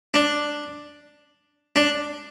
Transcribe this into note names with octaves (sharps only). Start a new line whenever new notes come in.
D4
D4